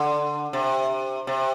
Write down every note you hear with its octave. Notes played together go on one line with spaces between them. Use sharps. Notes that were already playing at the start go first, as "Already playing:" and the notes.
Already playing: D3
C3
C3